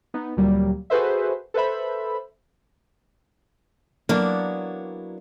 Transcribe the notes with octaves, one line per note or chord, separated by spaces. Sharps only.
B3 D#4
D2 A#2 F#3 G3 A#3
F#4 G#4 A4 B4 C5 E5
A4 B4 C5 E5 B5
F#3 A#3 B3 D4 E4 C#5